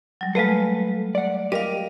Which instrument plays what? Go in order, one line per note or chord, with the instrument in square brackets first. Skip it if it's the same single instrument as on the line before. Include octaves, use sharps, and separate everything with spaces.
[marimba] F#3 G3
[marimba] G#3 A3 [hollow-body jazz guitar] A4 B4 F5
[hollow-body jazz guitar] D5 F#5
[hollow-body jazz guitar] G4 A#4 [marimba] D#5 F5